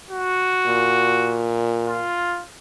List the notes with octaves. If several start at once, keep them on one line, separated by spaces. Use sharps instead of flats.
F#4
A#2
F4